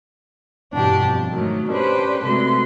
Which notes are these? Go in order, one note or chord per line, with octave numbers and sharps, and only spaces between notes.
E2 G2 B2 D4 G4
F2
G#2 D#3 F#3 A3
C#4 D4 G4 B4 C5
C3 G#3 A3 F#4 B4 C6